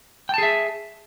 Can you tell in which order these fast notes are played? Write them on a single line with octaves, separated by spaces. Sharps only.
G5 A5 G#4 E5